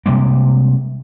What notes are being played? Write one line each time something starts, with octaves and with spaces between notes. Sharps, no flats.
C3 G3 G#3 A#3